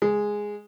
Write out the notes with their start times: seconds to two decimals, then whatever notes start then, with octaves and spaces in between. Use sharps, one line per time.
0.02 G#3